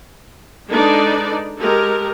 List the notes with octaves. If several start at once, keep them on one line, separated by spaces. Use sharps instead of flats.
G#3 D4 D#4 A4 B4 D5
G#3 G4 A4 A#4